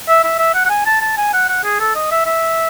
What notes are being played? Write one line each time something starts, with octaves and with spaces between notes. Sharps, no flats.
E5
E5
E5
F#5
F#5
G#5
A5
A5
G#5
F#5
F#5
G#4
A4
D#5
E5
E5